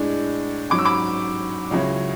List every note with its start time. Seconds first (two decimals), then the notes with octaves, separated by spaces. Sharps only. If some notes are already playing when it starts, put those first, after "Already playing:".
Already playing: A2 G#3 D4
0.70 G#2 F#3 C#4 D6
0.79 E6
0.85 B5 D6
1.71 C#2 C#3 F#3 C#4 E4